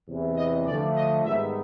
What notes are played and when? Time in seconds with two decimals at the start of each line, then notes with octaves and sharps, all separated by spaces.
0.08 E2 C3 E3
0.37 D#5
0.67 D3 F3 A3 D5
0.96 D#5
1.25 G#2 D#3 G3 B3 D#4 E5